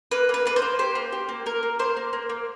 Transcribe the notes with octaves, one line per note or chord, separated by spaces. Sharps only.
A#3 B4
A#3 B4
A#3 B4
C5
A#3
G4 C5
A#3
G4
A#3
A#3 A#4
A#3
A#3 C5
A#3
A#3
A#3